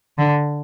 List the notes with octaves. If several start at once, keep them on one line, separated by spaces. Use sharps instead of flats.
D3